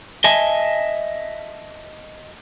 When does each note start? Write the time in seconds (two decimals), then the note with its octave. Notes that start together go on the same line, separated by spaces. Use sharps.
0.24 D#5 E5 G#5 A5